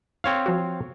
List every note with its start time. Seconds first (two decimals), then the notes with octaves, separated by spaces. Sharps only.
0.24 C4 C#5 F5
0.46 F3 F#4